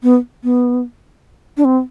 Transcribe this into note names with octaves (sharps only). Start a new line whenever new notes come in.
B3
B3
D4
C4